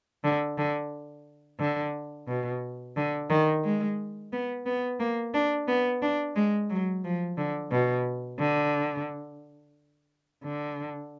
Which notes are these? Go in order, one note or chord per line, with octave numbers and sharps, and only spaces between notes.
D3
D3
D3
B2
D3
D#3
G#3
B3
B3
A#3
D4
B3
D4
G#3
F#3
F3
D3
B2
D3
D3